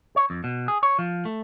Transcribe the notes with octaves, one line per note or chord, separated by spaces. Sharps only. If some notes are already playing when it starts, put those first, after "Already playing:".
C#5
F2
B2
G#4
C#5
F3
A3